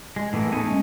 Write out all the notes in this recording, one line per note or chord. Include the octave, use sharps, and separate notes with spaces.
G#3
A2 E3 F#3 G#3 A#3
A3 B3 D#4 G#4 G#5
G#3 A3 C#4